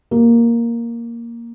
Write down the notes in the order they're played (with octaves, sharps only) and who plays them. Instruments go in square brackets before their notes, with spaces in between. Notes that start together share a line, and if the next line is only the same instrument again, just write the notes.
[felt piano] A#3